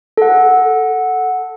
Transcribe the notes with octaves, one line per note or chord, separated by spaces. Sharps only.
A4 F#5